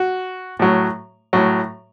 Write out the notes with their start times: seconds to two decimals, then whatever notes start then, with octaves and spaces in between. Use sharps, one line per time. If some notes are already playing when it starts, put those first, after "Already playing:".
Already playing: F#4
0.59 A2 F#3
1.33 A2 F#3